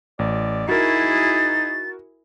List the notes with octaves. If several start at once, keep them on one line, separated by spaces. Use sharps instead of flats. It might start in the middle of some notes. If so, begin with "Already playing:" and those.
A1 D5
D#4 E4 F#4 G#4 A#4 A6